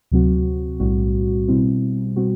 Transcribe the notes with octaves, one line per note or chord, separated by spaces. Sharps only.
D2 C3 F#3 C4 F#4
B1 A2 G3 C4 F#4
B2 G3 C4 E4
B2 G3 C4 F#4